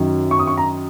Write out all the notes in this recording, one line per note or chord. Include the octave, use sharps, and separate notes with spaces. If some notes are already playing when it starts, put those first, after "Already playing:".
Already playing: F#2 D#3 F#3
C#6
D#6
C#6
A#5